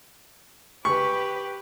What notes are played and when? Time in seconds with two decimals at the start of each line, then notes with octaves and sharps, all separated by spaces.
0.85 G4 B4 C#6